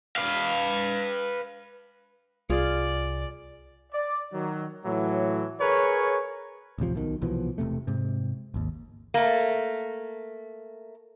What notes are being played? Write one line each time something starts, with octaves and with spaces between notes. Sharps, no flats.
B4 F5
C2 F4 G#4 D5 F5
D5
D#3 F#3
A2 E3 F#3
G#4 A#4 B4 C#5
A1 D2 C3 F3
B1 B2 D#3
C2 B2 E3 F3
E1 C#2 C3 A3
G#2 C3
G#1 D#2
A3 A#3